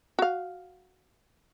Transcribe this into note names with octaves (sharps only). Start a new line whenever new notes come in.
F#4 F5